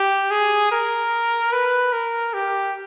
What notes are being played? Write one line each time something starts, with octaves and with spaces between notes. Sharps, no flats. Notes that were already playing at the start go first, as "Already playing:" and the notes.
Already playing: G4
G#4
A#4
B4
A#4
G4